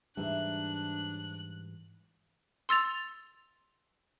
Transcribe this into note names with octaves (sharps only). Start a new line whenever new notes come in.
G#2 E3 G3 D4 C5 E5 A#5 F#6
C6 E6 A6 F7